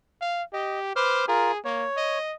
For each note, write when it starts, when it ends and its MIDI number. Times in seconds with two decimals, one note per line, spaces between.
0.21 0.43 77
0.53 0.92 67
0.53 0.79 75
0.96 1.25 71
0.96 1.25 72
0.96 1.25 86
0.96 1.25 89
1.28 1.52 65
1.28 1.59 68
1.28 1.52 70
1.65 1.86 58
1.65 2.18 73
1.97 2.35 75